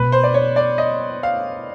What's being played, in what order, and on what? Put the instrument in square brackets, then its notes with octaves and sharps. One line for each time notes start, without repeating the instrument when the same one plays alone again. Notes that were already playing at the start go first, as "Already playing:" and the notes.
Already playing: [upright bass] B2 [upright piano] B4
[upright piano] C5
D5
C#5
D5
D#5
F5